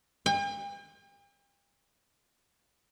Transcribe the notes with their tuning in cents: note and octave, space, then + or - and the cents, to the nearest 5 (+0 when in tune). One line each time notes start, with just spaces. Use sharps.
G5 +45